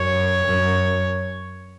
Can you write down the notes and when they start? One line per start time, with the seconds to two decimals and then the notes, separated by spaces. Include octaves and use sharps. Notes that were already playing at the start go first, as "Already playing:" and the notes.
Already playing: F#2 C#5
0.44 F#2